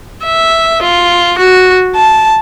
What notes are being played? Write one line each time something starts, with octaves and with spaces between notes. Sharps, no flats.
E5
F4
F#4
A5